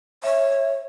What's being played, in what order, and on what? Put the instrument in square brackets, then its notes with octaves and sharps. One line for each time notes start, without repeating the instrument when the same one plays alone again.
[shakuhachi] C#5 [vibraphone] E5